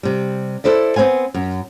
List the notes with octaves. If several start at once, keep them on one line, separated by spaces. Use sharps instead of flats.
C3 G3
E4 A4 C5 D5 E5
B3 C4 C5 F5 G#5
F#2